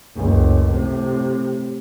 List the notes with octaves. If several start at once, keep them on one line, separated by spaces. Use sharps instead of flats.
F#1 C#2
A2 C3